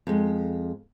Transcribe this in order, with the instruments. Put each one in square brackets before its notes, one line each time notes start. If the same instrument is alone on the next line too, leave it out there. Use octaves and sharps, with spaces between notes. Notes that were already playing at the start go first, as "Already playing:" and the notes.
[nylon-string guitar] F2 G#3